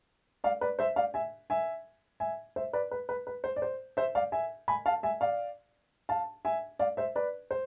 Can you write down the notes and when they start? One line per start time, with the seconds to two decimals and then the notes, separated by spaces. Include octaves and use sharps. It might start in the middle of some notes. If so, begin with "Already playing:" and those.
0.44 D5 F5
0.61 B4 D5
0.79 C5 E5
0.96 D5 F5
1.14 E5 G#5
1.50 E5 G#5
2.20 E5 G#5
2.56 C5 E5
2.73 B4 D5
2.91 B4
3.09 B4
3.27 B4
3.44 C5
3.56 D5
3.62 C5
3.97 C5 E5
4.15 D5 F5
4.32 E5 G#5
4.68 G#5 B5
4.86 F5 A5
5.03 E5 G#5
5.21 D5 F5
6.09 F5 A5
6.45 E5 G#5
6.79 D5 F5
6.97 C5 E5
7.16 B4 D5
7.51 C5